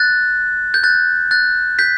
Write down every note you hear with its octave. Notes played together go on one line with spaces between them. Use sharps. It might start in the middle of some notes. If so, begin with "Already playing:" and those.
Already playing: F#6 A6
G6
F#6 A6
F#6 A6
G6 B6